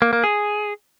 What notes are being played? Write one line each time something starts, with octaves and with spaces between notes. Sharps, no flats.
A#3
A#3
G#4